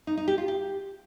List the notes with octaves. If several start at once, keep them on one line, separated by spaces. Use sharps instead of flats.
D#4
D#4
G4
F4
G4